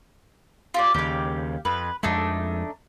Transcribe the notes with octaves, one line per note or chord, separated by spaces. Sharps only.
F4 G4 D5
D#2 C#3 G4 F5
F2 B4
F2 G#3 A3 D4 D#4